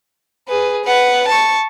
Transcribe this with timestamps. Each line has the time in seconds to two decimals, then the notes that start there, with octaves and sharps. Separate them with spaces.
0.48 G#4 B4
0.85 B4 F#5
1.28 A5 C#6